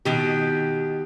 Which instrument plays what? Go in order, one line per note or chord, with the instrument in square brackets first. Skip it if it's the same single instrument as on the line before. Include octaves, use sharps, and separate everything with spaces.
[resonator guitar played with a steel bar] B2 D#3 G4